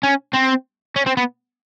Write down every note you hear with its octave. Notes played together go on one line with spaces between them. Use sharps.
C#4
C4
C#4
C4
B3